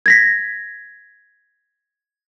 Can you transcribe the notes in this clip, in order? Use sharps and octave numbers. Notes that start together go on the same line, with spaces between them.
G#6 A#6 B6